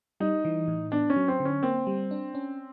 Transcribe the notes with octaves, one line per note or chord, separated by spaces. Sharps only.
G3 D#4
E3
A2
B3 D4
C#4
F#3
C4
D3
C#4
A#3 C4
G3
D4
C#4